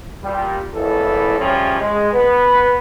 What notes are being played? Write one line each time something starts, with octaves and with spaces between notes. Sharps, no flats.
A#2 G3
G#1 A2 E3 A#3 A4
C#3 F3 G3 A3 C#4
G#3
B3 B4